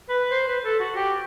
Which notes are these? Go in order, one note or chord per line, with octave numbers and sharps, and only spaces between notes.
B4
C5
B4
A4
F#4
G4